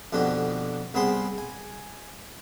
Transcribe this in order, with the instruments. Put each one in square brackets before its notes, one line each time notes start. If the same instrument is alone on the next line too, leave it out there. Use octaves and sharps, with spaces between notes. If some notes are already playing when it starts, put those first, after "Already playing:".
[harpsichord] F2 B2 D3 G4
C2 B3 C4 G#4 B5 C6
G#5